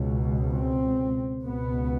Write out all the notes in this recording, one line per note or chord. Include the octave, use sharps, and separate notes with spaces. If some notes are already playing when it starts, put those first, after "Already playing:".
Already playing: C#2 B2
C4
C#2 B2 B3